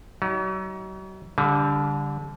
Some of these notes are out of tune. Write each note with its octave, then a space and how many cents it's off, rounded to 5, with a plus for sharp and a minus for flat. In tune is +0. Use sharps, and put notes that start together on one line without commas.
F#3 +40 D#4 +40
D3 -25 G3 +15 G#5 +20